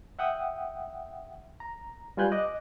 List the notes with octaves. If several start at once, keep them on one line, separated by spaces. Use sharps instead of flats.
E5 F#5 G5 D#6
A#5
G3 F4 B4 G#5 F#6 G6
D#5 D6 F#6